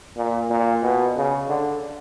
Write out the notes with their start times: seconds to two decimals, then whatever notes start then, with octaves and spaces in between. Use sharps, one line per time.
0.17 A#2
0.50 A#2
0.82 B2
1.17 C#3
1.49 D3